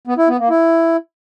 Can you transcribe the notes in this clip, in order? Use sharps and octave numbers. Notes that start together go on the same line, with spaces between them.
B3
E4
B3
A#3
E4